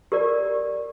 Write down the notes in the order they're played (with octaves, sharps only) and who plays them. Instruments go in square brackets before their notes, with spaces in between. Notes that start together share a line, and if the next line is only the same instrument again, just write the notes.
[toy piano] G4 A#4 D5